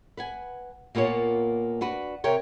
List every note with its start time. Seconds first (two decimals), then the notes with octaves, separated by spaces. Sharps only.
0.17 B4 F#5 G#5
0.95 A#2 A#3 B3 F4 C#5
1.81 D4 F#4 B4
2.24 C3 A#4 C#5 G5